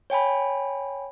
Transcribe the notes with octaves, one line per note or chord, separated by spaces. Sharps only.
C#5 G5 G#5 B5